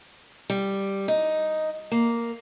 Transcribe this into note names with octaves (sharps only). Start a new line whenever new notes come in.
G3
D#4
A#3